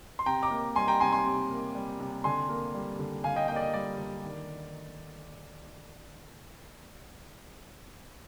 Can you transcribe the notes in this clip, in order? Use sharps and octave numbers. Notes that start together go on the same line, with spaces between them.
C6
C3 G5 A#5
A#5 D6
A#3
G3 G#5 C6
G5 A#5
C3 G#5 C6
G#5 C6
C3
A#3
G3
C3
D3 G#5 C6
A#3
G3
D3
D3 F5 G#5
D#5 G5
A#3 D#5 G5
D5
D#5
G3 D5
D3
D#3